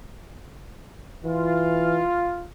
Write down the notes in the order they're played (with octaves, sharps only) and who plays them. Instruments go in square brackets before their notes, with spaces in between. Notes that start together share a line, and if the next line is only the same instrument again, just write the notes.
[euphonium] E3 [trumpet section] F4